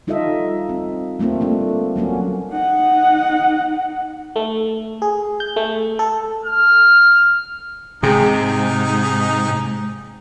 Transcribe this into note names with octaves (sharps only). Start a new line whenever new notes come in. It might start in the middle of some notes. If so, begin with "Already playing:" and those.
G3 D#4 F4 A4 D#5 E5
C4
G3 A3 A#3 C4 F4
A3 D4
F#3 A#3 C#4 F#4
D#4 F#5
A3
G#4
G6
A3
A4
F6
G#2 C3 D#4 G#4